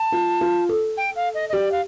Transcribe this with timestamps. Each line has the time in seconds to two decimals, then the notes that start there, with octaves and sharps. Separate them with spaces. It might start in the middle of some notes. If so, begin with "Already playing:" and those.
Already playing: A5
0.12 F4
0.41 F4
0.69 A4
0.97 G5
1.16 F5
1.34 D#5
1.49 D#5
1.53 G4 D5
1.72 F5